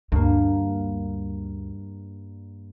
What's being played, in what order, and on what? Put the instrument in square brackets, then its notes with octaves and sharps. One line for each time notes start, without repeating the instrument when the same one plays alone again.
[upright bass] D2 [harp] G2 A#3